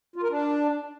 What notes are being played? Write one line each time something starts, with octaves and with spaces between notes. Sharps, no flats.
F4
A#4
D4